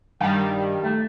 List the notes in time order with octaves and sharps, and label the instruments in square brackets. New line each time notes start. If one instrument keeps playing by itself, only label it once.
[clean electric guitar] G2 F5 [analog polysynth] D#3 G3
[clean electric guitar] A3